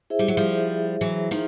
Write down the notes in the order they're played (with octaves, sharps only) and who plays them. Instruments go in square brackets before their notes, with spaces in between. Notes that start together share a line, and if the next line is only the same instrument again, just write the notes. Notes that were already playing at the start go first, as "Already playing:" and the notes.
[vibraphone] E4 G#4 C5 E5
[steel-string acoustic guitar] G3
F#3
F3 G3
E3 F#3
D#3 F3